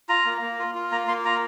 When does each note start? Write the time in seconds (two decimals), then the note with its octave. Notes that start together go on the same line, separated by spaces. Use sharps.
0.09 F4 A#5
0.25 A#3
0.41 A#3
0.59 F4
0.75 F4
0.92 A#3 A#5
1.08 A#3 C6
1.25 F4 A#5